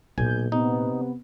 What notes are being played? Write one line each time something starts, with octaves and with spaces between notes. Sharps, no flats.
B1 A#2 A#3 G#5 G6
C3 B3 D#4